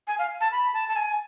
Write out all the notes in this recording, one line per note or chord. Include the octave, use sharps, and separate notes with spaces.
G#5
F5
A5
B5
A5
A5
G#5